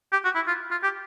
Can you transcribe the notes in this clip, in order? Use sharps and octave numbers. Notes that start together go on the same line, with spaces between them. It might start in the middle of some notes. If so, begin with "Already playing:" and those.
G4
F#4
E4
F4
F4
G4